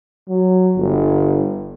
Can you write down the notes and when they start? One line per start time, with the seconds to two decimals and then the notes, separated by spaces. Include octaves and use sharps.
0.28 F#3
0.76 G1